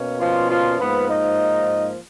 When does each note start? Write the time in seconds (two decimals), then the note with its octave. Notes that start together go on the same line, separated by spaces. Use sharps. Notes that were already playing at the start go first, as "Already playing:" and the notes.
Already playing: B2 A#3 C#4
0.20 F3 F4
0.50 F3 F4
0.79 G#2 F3 A#3 B3 B4
1.09 D#4 D#5